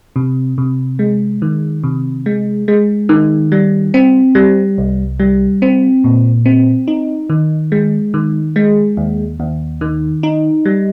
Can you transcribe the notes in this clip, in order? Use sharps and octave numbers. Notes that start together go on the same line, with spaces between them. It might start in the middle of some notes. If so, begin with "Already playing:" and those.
C3
C3
G#3
D#3
C3
G#3
G#3
D#3
G3
C4
G3
C2
G3
C4
A#2
C4
D#4
D#3
G#3
D#3
G#3
D#2
D#2
D#3
D#4
G3